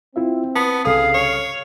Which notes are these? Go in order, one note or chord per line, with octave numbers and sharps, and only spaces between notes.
C4 E4 F4 E5
B3 A5
C2 G2 C#3 G#4 A4 F5 D#6
C#5